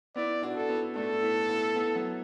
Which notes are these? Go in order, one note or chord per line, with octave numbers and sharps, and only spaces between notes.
B3 E4 D5
D4 F#4
A4
B3 E4
A3 D4 A4
B3 E4
B3 E4
B3 E4
F#3 B3